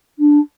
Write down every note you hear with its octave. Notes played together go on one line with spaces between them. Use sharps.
D4